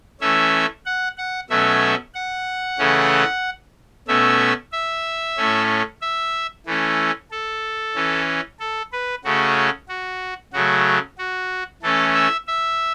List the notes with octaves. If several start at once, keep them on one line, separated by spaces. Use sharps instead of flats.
E3 A3 C#4 E5
F#5
F#5
B2 F#3 A3 C#4 E5
F#5
C#3 E3 A3 C#4
B2 A3 C#4 E5
E5
A2 A3 C#4
E5
E3 A3 C#4
A4
E3 C#4
A4
B4
C#3 A3 C#4 F#4
F#4
C#3 F#3 A3 F#4
F#4
E3 A3 C#4 A4
E5
E5